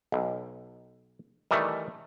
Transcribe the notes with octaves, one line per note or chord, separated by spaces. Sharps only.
B1
D#3 E3 G3 A3